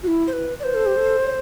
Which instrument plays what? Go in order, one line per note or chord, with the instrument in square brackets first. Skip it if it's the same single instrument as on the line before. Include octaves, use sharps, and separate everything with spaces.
[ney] F#4
E4
[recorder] C5
B4
D5
[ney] B4 [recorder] C5
[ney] A4
G4
A4
C#5